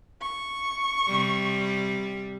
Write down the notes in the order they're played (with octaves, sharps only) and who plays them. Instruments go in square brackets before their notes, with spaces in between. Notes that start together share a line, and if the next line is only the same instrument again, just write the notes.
[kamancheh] C#6
[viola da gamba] C3 G3